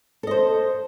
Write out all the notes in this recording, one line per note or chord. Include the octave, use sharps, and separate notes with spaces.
A4 C5 D#5